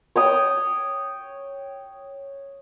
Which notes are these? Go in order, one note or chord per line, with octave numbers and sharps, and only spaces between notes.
C#5 G5 D#6